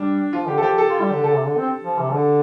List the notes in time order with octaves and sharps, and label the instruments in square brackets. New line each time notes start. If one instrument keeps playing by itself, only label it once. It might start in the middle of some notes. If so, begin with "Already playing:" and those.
Already playing: [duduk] G3 [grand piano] D4
[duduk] F3 [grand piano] F4
[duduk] D3 [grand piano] G4
[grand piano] A4
[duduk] F3 [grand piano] G4
[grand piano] A4
[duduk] F4
G3
D3
[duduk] D3 [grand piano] A4
[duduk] C3
D3
C4
F3
C3
F3
D3